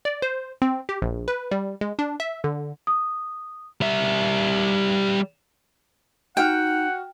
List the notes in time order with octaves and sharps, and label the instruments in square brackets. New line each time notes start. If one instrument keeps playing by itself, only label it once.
[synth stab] D5
C5
C4
G4
A#1
B4
G3
G#3
D4
E5
D3
[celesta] D#6
[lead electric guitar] G3 E5
[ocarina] D#4 [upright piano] F#4 F6 [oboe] F#5 [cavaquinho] G5